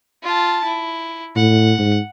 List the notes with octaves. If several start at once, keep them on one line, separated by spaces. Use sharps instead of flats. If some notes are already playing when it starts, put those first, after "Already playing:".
F4 A5
E4
A2 F#5
G#2